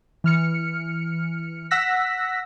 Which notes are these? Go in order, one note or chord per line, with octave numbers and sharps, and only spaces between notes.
E3 F6 C#7
F#5 E6 F#6 A#6 B6